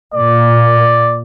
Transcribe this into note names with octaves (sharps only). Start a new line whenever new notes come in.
A#2 D5